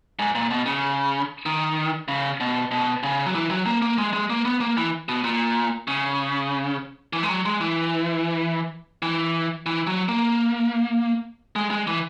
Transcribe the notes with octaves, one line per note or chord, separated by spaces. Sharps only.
G#2
A#2
B2
C#3
D#3
C#3
B2
B2
C#3
F#3
E3
F#3
A#3
A#3
G#3
G#3
A#3
B3
A#3
E3
B2
A#2
C#3
E3
G#3
F#3
G#3
E3
E3
E3
F#3
A#3
G#3
G#3
E3